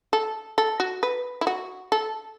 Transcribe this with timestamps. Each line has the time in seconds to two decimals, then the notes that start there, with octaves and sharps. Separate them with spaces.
0.13 A4
0.58 A4
0.80 F#4
1.03 B4
1.41 E4
1.47 F#4
1.92 A4